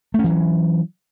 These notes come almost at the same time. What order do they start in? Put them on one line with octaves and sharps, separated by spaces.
A3 C#4 E3 F#3